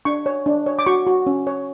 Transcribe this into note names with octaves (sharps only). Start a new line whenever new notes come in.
D4 C#6
C#5
D4
C#5
D6
F#4 C#6
F#4
C#4
C#5